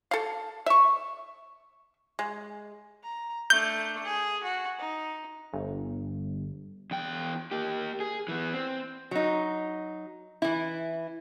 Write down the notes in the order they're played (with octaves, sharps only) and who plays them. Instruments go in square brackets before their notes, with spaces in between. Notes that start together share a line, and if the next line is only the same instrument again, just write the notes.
[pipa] A4 F5
E5 C#6
G#3
[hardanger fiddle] A#5
[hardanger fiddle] A3 D4 [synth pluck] G6
[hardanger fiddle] G#4
F#4
D#4
[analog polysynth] G1
[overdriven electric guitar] E2 G5
A#3 G4
G#4
E3 B3
C4
[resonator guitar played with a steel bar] F#3 D#4
E3 E4